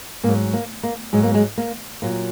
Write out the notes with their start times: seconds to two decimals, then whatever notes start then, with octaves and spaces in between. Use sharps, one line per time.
0.23 G#2 A#3
0.28 F#3
0.53 A#3
0.83 A#3
1.13 G#2 F#3 G#3
1.23 A#3
1.34 G#3
1.58 A#3
2.02 A#2 F#3 A#3